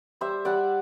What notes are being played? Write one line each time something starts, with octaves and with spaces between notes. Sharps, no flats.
G3 C5 E5
G3 D5 F#5